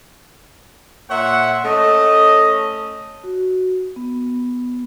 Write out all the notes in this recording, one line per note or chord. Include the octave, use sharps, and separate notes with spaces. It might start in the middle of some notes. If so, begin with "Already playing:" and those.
A#2 C#5 E5 F#5 C6
A3 C#4 D#5
F#4
B3